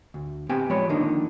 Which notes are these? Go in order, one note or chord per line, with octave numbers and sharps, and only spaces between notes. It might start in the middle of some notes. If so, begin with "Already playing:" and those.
D2
B3 C4 G4 G5 G#5
F3 G#3 B3 B4 C#5 D5
D3 D#3 F3 A#3 D4 D#4